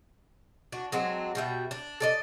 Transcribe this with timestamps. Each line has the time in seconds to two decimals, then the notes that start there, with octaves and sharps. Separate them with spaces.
0.72 D4 F#4
0.92 F#3 G#3 C4 D4
1.35 B2 G3 E5
1.71 D4
2.00 A4 D5 D#5